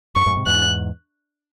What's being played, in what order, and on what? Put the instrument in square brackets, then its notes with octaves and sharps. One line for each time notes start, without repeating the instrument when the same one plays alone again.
[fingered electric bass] F#2 [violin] C#6
[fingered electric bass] F#2 A2
G#2 C3
[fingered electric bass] E2 G#2 [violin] F#6